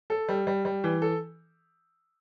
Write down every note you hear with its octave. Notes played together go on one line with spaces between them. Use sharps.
A4
G3
G3
G3
E3
A4